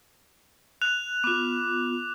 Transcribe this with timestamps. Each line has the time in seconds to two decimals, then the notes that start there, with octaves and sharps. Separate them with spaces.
0.82 F#6 F7
1.24 B3 F4 D6